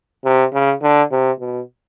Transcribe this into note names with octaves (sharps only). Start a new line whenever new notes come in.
C3
C#3
D3
C3
B2